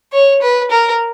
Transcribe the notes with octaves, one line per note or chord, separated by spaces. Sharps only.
C#5
B4
A#4